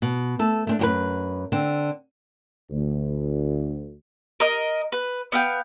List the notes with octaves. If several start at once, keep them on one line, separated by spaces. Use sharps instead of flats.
B2
A3 A4
A3 C4 D4
F#2 G4 B4
D3 C4
D2
A#4 D#5
B4
B3 F5 G5